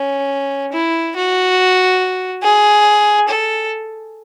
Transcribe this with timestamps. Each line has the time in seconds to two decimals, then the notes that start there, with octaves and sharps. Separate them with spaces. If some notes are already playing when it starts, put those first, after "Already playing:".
Already playing: C#4
0.73 E4
1.16 F#4
2.42 G#4
3.28 A4